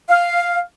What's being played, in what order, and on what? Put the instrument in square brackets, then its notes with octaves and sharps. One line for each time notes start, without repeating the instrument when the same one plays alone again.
[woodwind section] F5